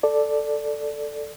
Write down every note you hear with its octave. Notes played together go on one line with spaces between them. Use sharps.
A4 D5